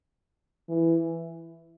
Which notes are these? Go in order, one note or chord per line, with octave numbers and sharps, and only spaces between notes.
E3